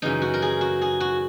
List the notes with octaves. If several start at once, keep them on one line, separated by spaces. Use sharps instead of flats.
F#2 C#3 E3 D#4
F#4
A#4
G#4
F#4
G#4
F#4